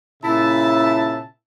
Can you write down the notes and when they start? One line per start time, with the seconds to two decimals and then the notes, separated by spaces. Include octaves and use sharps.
0.23 A#2 C#3 E4 E5 A5